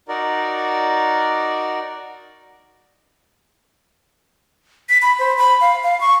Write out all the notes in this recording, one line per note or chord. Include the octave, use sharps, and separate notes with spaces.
D#4 F#4 A#4 D5
B6
B5
C5
B5
F5
F5
C#6